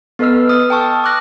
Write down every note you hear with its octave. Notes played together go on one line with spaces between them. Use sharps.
B3 A4 B4 D#5 E6 F6
D#6 F6
G5 A5 C#6 E6
D6 F6 F#6 A#6